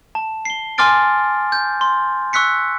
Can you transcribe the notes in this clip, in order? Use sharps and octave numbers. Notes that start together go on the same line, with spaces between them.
A5
C7 G7
G#5 C6 D6 F6 A6 D7
G6
C6
C#6 E6 F#6 B6 C#7